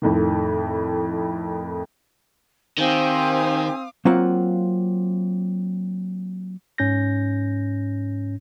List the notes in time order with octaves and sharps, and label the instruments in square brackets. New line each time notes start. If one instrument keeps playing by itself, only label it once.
[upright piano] F2 A2 D#3
[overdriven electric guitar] D#3 [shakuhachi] C4 [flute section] G4 C5 G#5 [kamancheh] F5 D#6
[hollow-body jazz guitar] F#3 A#3 C4 F4 F#5
[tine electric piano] G#2 C#4 G6 A#6